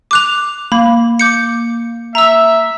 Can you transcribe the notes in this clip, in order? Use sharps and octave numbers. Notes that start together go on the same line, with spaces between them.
D6 F#6 F7
A#3 B5
D6 G6 C#7
E5 A#5 E6